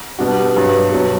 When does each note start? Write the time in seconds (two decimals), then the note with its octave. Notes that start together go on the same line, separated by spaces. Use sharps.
0.19 B2 G3 D4 F#4
0.55 G2 F#3 B3
0.92 B2 F#3